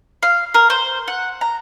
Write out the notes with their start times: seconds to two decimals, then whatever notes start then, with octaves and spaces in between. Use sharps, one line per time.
0.23 F5
0.54 A#4
0.70 C5
1.08 F#5
1.41 A#5